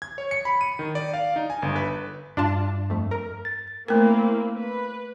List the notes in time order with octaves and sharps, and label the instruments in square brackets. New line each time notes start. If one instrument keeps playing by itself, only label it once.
[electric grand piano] G#6
C#5
C#7
B5
D#7
D#3
D5
F5
D#4
G#5
G1
B4
[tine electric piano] G2 [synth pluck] D4 F4 A5
[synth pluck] F2 A3
A#4
[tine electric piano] A6
[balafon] A3 A#4 [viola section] A#3 C4 E4
[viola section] B4